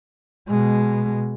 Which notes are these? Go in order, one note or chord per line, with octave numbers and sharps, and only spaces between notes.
B2 G#3